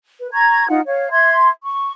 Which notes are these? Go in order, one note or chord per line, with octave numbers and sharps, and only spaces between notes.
B4
A#5 C#6 G#6
D#4 F4 F#5
C#5 F5
E5 C6 G#6
C#6